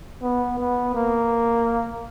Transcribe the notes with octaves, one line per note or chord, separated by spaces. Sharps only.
B3
B3
A#3